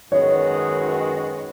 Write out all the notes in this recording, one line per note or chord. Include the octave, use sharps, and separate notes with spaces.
F#2 D#3 G#3 B3 F#4 C#5